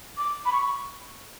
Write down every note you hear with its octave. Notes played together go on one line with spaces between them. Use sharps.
D6
B5
C#6